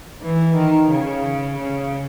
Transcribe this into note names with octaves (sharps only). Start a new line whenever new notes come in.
E3
D#3
C#3
C#3